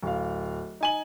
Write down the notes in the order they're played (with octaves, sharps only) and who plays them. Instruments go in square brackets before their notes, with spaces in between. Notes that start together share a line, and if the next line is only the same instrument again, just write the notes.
[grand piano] D1 F5
D#4 G#5 F#7